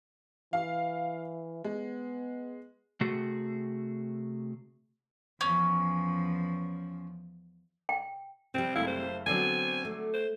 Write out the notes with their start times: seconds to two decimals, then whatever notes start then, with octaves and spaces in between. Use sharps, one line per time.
0.53 E3 F5
1.64 G#3 B3
3.01 C3 A3 F#4 G#4
5.41 E2 F3 C#4
7.89 G5
8.54 C3 G3 C4
8.75 F#1 A3 E4 F5
8.87 C5
9.26 D3 F#3 B3 C4 G#5
9.85 A3
10.14 C5